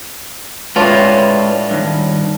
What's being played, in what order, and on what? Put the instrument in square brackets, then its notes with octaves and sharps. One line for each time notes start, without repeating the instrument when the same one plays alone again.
[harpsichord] A2 F4 [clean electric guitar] G#3 B4 C#5 [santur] D4
[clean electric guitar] G2 D#3